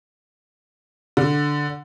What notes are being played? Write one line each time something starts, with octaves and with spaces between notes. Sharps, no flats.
D3